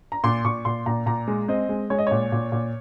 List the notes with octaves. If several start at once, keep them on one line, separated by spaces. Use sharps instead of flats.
A#5
A#2 C6
A#2 C#6
A#2 C6
A#2 A#5
A#2 A#5
G#3
C4 D#5
G#3
G#3 C#5
D#5
A#2 C#5
A#2
A#2